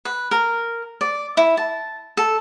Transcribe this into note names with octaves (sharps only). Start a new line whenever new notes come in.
B4
A#4
D5
E4
A5
A4